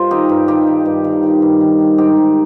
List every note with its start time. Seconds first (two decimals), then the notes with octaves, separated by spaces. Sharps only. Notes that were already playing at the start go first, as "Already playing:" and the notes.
Already playing: G2 F4 A#4 C5 D#5
0.11 D#3 D#4 G4
0.29 G2
0.48 D#3 D#4 G4
0.67 D#3
0.85 G2
1.04 D#3
1.23 D#3
1.42 G2
1.61 D#3
1.79 D#3
1.98 G#2 D#4 G4
2.17 D#3